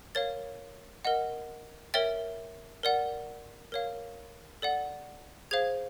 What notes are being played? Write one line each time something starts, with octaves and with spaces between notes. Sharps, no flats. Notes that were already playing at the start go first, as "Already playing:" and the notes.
A#4 C#5 F5 A6
A#4 D#5 F#5
A#4 C#5 E5 G5 A6
A#4 D5 F#5
A#4 C#5 F5
A4 D5 F#5
G#4 C5 F5 G#6